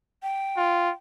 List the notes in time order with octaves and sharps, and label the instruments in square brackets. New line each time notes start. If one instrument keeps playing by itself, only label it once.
[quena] G5
[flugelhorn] F4